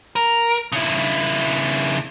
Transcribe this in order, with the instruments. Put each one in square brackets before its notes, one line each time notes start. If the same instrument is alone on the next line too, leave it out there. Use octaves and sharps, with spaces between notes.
[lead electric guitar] A#4
C#3 E4